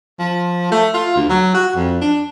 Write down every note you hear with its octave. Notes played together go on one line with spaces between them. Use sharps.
F3
A3
F4
D2
F#3
F#4
F2
D4